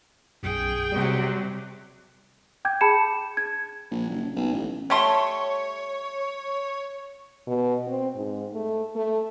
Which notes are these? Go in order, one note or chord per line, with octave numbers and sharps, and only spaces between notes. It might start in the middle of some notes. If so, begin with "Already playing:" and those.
B1 F#2 G#4 G5
C3 F#3 G3
G5 D6 G6 G#6
G#4 A5 B5 C#7 E7
G#6
A#1
F#1
B1
A1
G3 A3 C#5 C6
B2
C4
G#2
A3
A3